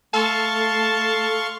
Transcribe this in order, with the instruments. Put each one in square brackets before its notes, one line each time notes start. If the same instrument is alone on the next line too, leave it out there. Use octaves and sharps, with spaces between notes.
[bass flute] A3 [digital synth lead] A4 [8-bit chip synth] F5 C6 C#6 [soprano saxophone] A5